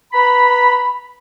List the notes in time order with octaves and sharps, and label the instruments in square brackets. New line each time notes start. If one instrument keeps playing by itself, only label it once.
[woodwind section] B4 A#5 B5